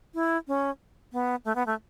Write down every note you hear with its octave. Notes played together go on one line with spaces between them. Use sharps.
E4
C#4
B3
A3
B3
A3